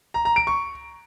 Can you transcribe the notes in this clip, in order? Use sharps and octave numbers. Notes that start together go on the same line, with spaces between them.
A#5
A#5
D7
C#6